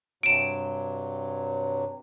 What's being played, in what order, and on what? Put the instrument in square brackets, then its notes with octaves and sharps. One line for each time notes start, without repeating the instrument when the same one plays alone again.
[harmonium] G2 C3 F#3 [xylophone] D7 E7